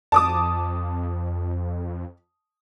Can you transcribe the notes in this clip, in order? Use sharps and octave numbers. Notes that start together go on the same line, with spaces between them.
F2 A5 D6 D#6